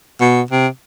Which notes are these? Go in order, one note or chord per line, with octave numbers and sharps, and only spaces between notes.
B2
C3